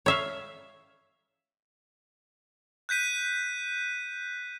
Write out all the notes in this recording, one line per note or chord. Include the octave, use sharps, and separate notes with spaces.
C#5 E5 F5
F#6 G6 B6 D#7